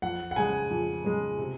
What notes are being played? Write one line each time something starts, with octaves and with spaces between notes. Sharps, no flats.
F2 F#5
F#5
C#3 G#3 G#5
F2
C#3 G#3
C3